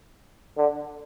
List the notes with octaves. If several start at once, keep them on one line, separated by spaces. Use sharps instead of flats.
D3